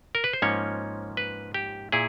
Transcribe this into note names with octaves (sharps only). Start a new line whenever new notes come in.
A#4
B4
C5
G#2 F3 A#3 C#4 C#5
B4
G4
A#2 E4 G#4